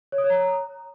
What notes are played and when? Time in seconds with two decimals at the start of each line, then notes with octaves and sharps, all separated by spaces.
0.12 C#5
0.18 D#6
0.24 C#5
0.30 A#5